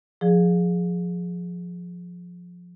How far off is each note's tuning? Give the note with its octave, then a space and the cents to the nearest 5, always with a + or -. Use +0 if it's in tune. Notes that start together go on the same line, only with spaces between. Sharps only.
F3 +20 G#4 +0 D5 +15